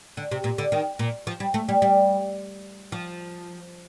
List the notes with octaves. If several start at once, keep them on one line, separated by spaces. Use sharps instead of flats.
D3
C3
A#2
D3
D#3
A#2
F3
G3
A3
G3
G3
F3